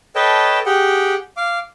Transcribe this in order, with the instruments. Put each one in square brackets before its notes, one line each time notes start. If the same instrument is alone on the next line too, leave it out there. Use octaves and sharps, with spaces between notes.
[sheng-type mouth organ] A4 B4 C#5 D#5 G5 A5
G4 G#4 F#5 G5
F5 D6